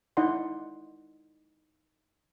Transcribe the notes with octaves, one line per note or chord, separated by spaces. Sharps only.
D#4 E4 D5 F#5 C6